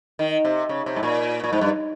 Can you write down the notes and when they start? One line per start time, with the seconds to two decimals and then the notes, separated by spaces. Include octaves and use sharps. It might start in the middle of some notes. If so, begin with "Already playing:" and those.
0.19 D#3
0.45 C3
0.69 C#3
0.86 C3
0.96 G#2
1.03 A#2
1.44 A#2
1.53 G#2
1.61 G2